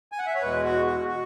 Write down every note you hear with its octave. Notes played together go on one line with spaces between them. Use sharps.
G#5
F#5
E5
C#5
E2 B2 G#3 B4
F#4
F#4
F#4